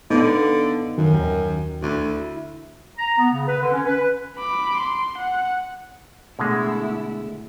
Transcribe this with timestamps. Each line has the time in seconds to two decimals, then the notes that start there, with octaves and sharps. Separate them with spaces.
0.10 D3 B3 D#4 D#5 F5
0.98 F#2 D#3
1.13 D#2 D#3
1.82 D2 E4
2.98 A#5
3.17 B3
3.32 C#3
3.47 B4
3.61 D3
3.72 C#4
3.86 B4
4.38 B5 D6
4.78 C6
5.18 F#5
6.39 B2 D3 G#3 A3 E4